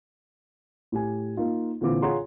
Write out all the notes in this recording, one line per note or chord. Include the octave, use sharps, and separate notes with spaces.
A2 G4 G#5
A#3 D#4 F4
A#2 D3 E3 C4 F4 D6
F4 G#4 C#5 F#5 A#5 C6